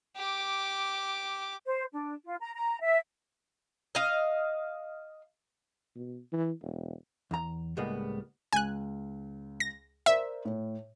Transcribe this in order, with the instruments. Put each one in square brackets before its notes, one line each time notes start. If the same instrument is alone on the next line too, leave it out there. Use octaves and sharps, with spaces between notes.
[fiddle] G4 D6
[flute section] C5
D4
F4
A#5
A#5
E5
[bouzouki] D#5 F5
[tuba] B2
E3
E1
[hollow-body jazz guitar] E2 A#5
C#2 A2 G3 G#3 A#3 B3
[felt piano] C#2 [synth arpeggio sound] G#5 F#6
[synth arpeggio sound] A#6
[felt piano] A#4 C5 D5 [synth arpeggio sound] E5
[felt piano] A2